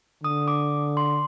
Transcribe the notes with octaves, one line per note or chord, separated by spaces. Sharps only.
D3 D#6
D6
C6